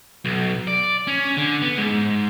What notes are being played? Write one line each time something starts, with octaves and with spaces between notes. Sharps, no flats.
B1
D5
C#4
D3
B3
G#2